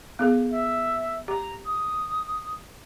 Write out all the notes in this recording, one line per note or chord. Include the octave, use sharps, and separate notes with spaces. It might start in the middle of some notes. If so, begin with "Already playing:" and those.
B3 G#4 A4
E5
G4 A#5
D#6